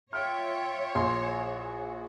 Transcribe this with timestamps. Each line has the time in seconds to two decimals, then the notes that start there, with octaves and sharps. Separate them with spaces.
0.13 F4 C#5 E5 G5 F6
0.95 A#1 E3 F#4 G#4 C6